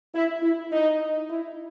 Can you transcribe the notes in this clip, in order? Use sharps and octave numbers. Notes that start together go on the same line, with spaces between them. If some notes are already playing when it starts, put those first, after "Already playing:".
E4
E4
D#4
E4